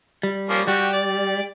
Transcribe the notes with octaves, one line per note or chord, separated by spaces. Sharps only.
G3
F3 A#3 C#4
G3 F#4 G4
D5